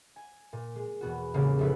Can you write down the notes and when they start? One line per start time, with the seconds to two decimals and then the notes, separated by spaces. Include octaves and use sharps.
0.16 G#5
0.53 A#2
0.75 G#3
1.01 E2 B2 B3 F#4
1.34 A1 C#3 G#3 A#3
1.59 F1 D#4 E4 B4